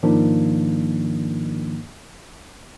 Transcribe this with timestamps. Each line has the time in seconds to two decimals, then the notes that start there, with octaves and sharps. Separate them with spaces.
0.03 G#2 D#3 F3 A#3 D4